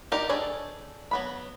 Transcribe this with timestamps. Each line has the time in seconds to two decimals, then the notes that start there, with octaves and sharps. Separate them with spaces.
0.12 D#4 G4 A#4 D5
0.29 D4 G#4 A4 C#5
1.11 F#3 B3 B5